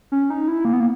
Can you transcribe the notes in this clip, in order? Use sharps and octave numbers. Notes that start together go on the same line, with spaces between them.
C#4
D#4
E4
A#3
B3
A#3